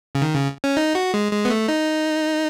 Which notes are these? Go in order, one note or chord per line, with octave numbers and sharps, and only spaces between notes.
C#3
D#3
C#3
C#4
D#4
F#4
G#3
G#3
B3
A3
D#4